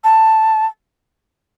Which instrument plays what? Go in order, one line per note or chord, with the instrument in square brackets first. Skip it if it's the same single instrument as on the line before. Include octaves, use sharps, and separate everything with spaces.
[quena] A5